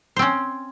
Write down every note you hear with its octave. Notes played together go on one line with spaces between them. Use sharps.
C4 C#4 C5